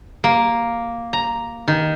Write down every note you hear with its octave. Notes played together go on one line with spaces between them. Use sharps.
A#3
A#5
D#3